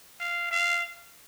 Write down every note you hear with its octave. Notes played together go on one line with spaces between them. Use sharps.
F5
F5